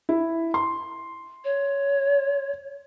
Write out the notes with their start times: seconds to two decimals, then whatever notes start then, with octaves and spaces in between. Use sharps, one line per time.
0.09 E4
0.54 C6
1.44 C#5